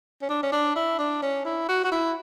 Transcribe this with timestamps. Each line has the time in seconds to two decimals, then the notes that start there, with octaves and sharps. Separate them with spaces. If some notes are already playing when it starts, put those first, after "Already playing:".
0.22 C#4
0.29 D4
0.43 C#4
0.52 D4
0.76 E4
0.99 D4
1.22 C#4
1.45 E4
1.69 F#4
1.84 F#4
1.92 E4